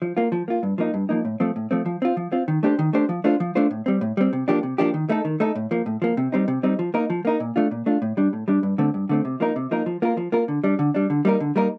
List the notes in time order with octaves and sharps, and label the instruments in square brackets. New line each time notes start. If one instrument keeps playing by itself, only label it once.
[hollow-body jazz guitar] F3
A#3 F4
F3
A#3 F4
G2
F3 A#3 D#4
G2
F3 A#3 D#4
A2
F3 A3 C4
A2
F3 A3 C4
F3
C4 F4
F3
C4 F4
D#3
A3 D4 G4 C5
D#3
A3 D4 G4 C5
F3
A3 D4 F4 C5
F3
A3 D4 F4 C5
A2
G3 C4
A2
G3 C4
C3
F3 A#3 D4 G4
C3
F3 A#3 D4 G4
D#3
A3 D#4 A4
D#3
A3 D#4 A4
A2
F3 A#3
A2
F3 A#3
C3
G3 C4 D#4
C3
G3 C4 D#4
F3
A#3 D#4 A#4
F3
A#3 D#4 A#4
A#2
A3 D4 F4
A#2
A3 D4 F4
A2
G3 D4
A2
G3 D4
G2
D3 A3 C4
G2
D3 A3 C4
C3
F3 A#3 D#4 A#4
C3
F3 A#3 D#4 A#4
F3
A#3 F4 A#4
F3
A#3 F4 A#4
D3
G3 D4
D3
G3 D4
D3
G3 A#3 D#4 A#4
D3
G3 A#3 D#4 A#4